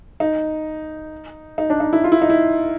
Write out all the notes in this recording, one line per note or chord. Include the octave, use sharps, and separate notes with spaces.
D#4
D#4
D4
D#4
E4
F4
E4
D#4
E4